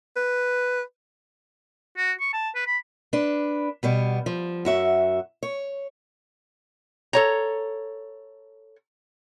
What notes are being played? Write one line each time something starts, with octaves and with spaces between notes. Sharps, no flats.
B4
F#4
C#6
A5
B4
B5
D4 B4
B2 G3 B3
F3
F#2 F#4 E5
C#5
A4 C#5 A#5